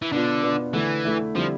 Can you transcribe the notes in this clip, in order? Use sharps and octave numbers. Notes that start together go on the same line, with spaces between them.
E3
B2 D3 B3 D4 F4
B2 B3 D4 F4
D3 E3 A3 E4
D3 A3 E4
D3 F3 G3 C4 E4